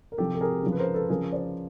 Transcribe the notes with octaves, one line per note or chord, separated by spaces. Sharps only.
A#4
C3 F3 G4 A4
A4
G#4 A#4
C#3 F3
B4
A#4 C5
A4 B4
C#3 F3 G#4 A#4
C5 D5